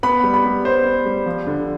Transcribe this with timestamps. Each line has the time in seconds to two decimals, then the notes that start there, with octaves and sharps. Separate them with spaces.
0.03 B3 B5
0.23 G3
0.34 B5
0.45 G3
0.65 B3 C5
0.85 B3
1.06 G3
1.26 F3
1.47 D3